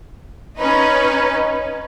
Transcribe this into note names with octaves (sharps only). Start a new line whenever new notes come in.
C#4 D#4 B4